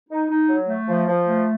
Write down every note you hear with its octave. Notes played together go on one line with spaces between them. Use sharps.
D#4
D#4
F#3
A3
F3
F3
A3